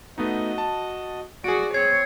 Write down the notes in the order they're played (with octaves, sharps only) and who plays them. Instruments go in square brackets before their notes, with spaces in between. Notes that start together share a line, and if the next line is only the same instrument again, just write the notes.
[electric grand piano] A3 B3 D#4 [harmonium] F#4 D#5
[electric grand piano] A5
[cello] F#4 [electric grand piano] G#4 D7 [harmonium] D5
[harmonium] C4 [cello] C#5 [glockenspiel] G#6 C7